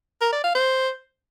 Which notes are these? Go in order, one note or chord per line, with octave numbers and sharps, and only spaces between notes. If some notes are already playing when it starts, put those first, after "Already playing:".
A#4
D5
F5
C5